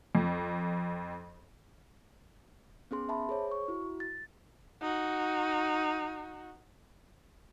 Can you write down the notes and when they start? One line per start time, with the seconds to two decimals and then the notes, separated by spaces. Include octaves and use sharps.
0.15 F2
2.91 B3 C#4 G#4 C6
3.09 E5 A5 B5
3.29 G#4 C5 C#5
3.51 C#6
3.68 E4 F#4
4.00 A6
4.82 D#4 F#4